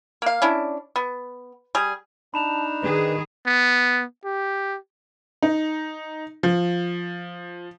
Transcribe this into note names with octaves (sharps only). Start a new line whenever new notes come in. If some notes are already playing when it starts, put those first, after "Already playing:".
A#3 F5
C#4 D4 E4
B3
G3 G#4
D4 D#4 A5 B5 E7 F7
D#3 G#4 B4
B3
G4
D#4
F3